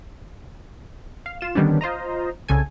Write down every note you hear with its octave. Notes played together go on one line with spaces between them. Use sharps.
F5
F4 E7
D3 D#3 G3 B3 C#4 D4
F4 C5 D#5 A#5
C2 C#3 A4 G#5